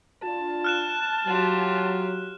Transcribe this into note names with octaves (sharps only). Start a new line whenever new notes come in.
D4 F4 A5
F6 F#6 E7
F#3 F4 G4